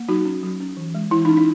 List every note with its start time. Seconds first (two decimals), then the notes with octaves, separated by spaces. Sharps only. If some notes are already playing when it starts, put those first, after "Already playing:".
Already playing: A#3
0.08 F#3 D#4 F#4
0.25 C#4
0.43 F#3
0.61 C#4
0.77 E3
0.94 G#3
1.11 E3 E4
1.25 D#4
1.29 C#4
1.37 D#4